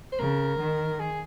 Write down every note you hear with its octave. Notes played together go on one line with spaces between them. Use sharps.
C5
C#3 A#4
D#3
G#4